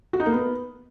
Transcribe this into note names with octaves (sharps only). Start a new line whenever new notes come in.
F#4
D#4
A#3
B3